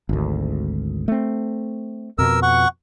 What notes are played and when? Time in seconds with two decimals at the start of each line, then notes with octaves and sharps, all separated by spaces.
0.09 G#1 D2
1.08 A3 C4
2.18 F2 B2 A#4 E6
2.43 F#5 C#6